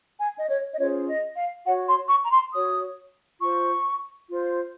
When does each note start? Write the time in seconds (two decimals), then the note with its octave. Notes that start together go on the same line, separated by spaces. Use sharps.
0.19 G#5
0.37 D#5
0.49 C#5
0.74 D#5
0.78 C#4 F4 G#4 C5 C#5
1.07 D#5
1.37 F5
1.66 F#4 F#5
1.68 C#5
1.88 C6
2.09 C#6
2.23 A#5
2.31 C6
2.53 F#4 C#5 D#6
3.41 F4 C5 C#6
4.29 F4 C5